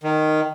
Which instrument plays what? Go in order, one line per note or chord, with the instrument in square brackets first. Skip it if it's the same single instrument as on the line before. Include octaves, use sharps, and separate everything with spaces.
[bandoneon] D#3